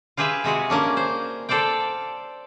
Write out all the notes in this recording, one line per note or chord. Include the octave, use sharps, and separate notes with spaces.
F4 G4 G#4 B4 E5
C3 G#3 F#4 G#4
A#3 C#4 D4
C5
A4 C5 D5 F5 G5